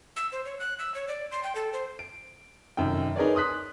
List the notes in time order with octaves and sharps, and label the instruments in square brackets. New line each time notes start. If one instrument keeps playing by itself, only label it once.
[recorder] E6
C5
C#5
F#6
E6
C#5
D5
C6
G5
A4
C5
[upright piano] D7
F1 F#2 D#3 G5
D#4 G#4 A#4 B4 C#5 D5
C6 D#6 F#6 B6